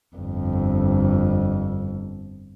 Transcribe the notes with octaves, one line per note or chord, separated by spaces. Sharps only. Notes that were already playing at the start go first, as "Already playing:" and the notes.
G1 F2